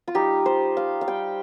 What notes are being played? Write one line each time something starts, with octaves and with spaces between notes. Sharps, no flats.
F4
G3 D#4 G4
C5
F5
F5
G3 D#4 G5